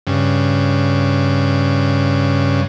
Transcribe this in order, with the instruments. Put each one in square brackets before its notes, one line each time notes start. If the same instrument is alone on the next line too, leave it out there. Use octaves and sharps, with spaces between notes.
[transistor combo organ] G2 C#3